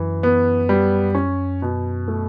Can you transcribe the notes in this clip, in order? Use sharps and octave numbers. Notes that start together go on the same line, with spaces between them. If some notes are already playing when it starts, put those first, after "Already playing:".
Already playing: F#2 E3
B3
G3
C#4
B2
A3